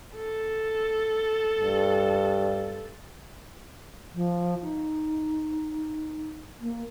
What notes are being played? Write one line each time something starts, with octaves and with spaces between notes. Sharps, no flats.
A4
G2
F3
D#4
A#3